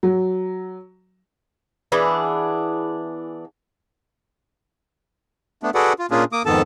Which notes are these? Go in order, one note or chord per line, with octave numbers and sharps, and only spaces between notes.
F#3
E3 B3 D4 G#4
A3 B3 D4
F#4 G#4 A4 B4 D5 F#5
F4
A#2 A#3 C#4 D4 F4 G#4
A#3 D6 D#6
F2 G#2 D#3 B3 A4 A5